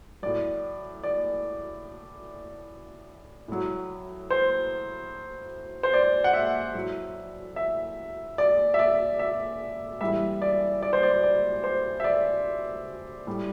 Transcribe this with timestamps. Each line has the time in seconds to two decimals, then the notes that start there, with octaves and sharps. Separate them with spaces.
0.22 A2 F#3 D5
1.03 D5
3.48 A2 F#3
4.30 C5
5.83 C5
5.93 D5
6.24 F#5
6.33 E5
6.75 A2 F#3
7.56 E5
8.38 D5
8.74 E5
8.79 D5
9.19 E5
10.01 A2 E3 G3 E5
10.42 D5
10.83 D5
10.93 C5
11.03 D5
11.23 D5
11.64 C5
12.00 E5
12.04 D5
13.27 A2 G3